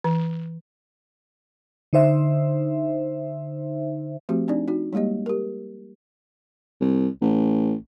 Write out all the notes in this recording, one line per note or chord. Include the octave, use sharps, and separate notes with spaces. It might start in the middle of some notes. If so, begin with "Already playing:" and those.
E3
D3 D#4 C5 E5
F3 A3 C4 F#4 G4
C4 D4 D#4 D5
D#4 F#4
G3 G#3 A#3 G4 D#5
G4 A#4
C2
A1